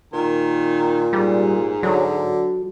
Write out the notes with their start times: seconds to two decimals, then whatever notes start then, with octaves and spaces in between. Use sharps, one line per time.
0.13 A#2 D#3
1.13 G#2 G3
1.83 D3 F#3